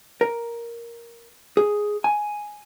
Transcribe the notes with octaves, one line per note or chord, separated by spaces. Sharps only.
A#4
G#4
G#5